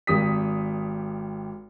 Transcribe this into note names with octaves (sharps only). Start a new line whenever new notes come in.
G#1 G3 G4 D#6 B6